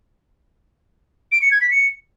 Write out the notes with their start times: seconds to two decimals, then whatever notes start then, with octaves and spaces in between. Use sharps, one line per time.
1.32 D7
1.42 C#7
1.51 G#6
1.61 B6
1.71 C#7